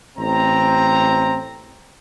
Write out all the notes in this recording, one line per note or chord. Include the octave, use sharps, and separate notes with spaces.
A1 C4 A#5